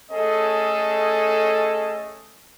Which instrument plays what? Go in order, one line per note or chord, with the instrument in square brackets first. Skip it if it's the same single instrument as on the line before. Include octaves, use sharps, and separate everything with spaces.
[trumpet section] A3 C#4 G#4 A4 D#5